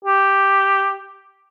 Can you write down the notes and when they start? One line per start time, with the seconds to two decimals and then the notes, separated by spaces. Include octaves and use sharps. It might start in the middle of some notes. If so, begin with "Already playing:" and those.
0.04 G4